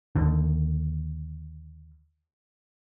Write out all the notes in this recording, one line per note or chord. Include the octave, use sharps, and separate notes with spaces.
D#2 D3